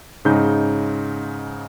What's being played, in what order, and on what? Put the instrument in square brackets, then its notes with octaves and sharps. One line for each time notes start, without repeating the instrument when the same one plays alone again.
[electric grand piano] G#2 C#3 D#4 G6